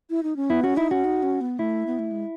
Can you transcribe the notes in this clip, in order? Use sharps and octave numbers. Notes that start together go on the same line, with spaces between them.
E4
D#4
C#4
B3 E4
C#4 F#4
D#4 E4
C#4 F#4
D#4
C#4
B3
A3 E4
B3
A3
G#3